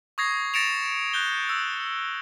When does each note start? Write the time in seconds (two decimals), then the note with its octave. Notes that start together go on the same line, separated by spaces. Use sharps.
0.18 C#6 D#6 G#6 A#6 C7
0.54 A6 A#6 C#7 D7 E7 F7
1.13 F#6 G6 G7
1.49 E6